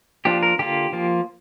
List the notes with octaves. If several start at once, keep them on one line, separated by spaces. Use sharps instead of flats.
F3 A#3 D4 F4 G4
A#4
D3 A#3 F4 G4
F3 A#3 F4